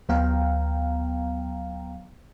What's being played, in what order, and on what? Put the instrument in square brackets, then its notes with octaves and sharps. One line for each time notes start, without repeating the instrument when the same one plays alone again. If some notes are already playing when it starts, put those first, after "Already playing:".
[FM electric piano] D2 F#3 B3 F5 G5 A#5